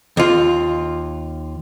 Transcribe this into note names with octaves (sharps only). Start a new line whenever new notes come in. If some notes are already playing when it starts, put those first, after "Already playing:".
D#2 F4